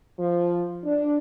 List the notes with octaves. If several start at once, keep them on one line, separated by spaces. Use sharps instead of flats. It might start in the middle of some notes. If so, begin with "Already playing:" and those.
F3
D4